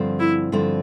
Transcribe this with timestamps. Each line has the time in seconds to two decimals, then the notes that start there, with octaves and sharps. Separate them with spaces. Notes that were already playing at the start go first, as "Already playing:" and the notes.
Already playing: G2 D3 F3 C4
0.19 E4
0.52 G2 D3 F3 C4